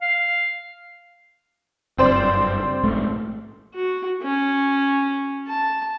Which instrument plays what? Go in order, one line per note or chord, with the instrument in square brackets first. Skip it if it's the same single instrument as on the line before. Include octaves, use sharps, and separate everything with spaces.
[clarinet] F5
[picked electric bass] F#1 G2 [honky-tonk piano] C4 C5 D5
[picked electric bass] A#1 G#2 A3
[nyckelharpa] F#4
C#4
A5